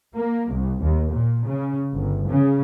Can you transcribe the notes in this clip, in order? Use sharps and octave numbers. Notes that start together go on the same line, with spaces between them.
A#3
C2
D#2
A#2
C#3
G1
C#3